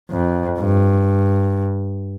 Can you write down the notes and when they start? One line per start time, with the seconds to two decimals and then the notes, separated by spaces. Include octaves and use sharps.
0.11 F2
0.59 G2